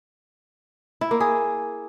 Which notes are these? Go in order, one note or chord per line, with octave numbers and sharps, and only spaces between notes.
E4
A#3
G#4